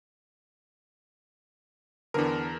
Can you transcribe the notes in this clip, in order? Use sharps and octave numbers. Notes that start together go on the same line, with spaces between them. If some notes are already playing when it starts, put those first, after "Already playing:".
E2 D3 B3 D4 A#4